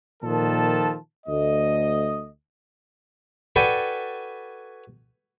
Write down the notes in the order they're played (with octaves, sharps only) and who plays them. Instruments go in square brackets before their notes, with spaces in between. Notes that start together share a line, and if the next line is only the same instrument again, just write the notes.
[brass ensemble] A#2 D#3 F3 A4 A5
D2 A3 D#5
[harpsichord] F#4 A4 B4 D5 G5 G#5